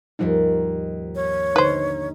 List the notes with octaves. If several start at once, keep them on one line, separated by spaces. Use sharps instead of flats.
D#2 G#2 F3 G3 D#4 F#5
C#5
D3 D#4 B4 C5